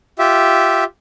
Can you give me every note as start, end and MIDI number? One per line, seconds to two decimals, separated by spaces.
0.19 0.84 65
0.19 0.84 67
0.19 0.84 76